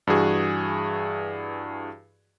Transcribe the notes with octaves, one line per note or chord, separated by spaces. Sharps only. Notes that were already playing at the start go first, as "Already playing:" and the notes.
G2 E3 F#4 G#4